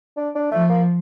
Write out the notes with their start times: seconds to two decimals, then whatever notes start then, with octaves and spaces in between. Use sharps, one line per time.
0.17 D4
0.35 D4
0.51 F3 A3
0.69 A#3